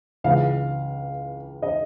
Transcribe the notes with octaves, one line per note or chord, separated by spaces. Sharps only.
C#2 C#3 E3 F5
D#5